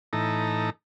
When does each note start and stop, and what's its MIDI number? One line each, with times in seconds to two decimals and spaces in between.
0.13 0.70 45
0.13 0.70 52
0.13 0.70 63
0.13 0.70 69
0.13 0.70 82